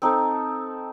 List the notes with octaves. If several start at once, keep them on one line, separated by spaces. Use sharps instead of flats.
C4 D#4 A4